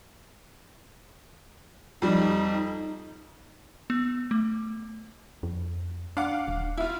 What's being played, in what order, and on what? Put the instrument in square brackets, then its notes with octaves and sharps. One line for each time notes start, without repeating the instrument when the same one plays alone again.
[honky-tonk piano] F2 G3 [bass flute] D#4
[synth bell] B3
A3
[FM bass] F2
[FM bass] D4 [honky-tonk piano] F5 F#5 D6
[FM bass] D#1
[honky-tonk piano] E4 F4